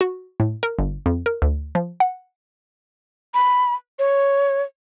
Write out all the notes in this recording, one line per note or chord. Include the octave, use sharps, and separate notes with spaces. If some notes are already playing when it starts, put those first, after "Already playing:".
F#4
A2
A#4
G1
F2
A#4
D2
F3
F#5
B5
C#5